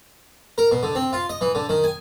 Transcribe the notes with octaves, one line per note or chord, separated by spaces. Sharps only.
A#4
B2
D3
C4
F4
D#5
E3
D3
D#3
G#5